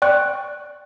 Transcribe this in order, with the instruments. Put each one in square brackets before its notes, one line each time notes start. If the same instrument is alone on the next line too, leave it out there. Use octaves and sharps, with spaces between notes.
[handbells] D5 G5 C#6 F#6